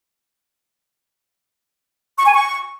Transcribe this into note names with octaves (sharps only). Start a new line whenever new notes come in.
C#6
G#5
C#6